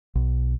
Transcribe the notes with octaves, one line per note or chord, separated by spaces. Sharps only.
B1